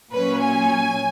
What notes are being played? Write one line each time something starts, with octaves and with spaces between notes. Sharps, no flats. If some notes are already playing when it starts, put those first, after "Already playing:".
A#2 F#3 C#4 B4
G#5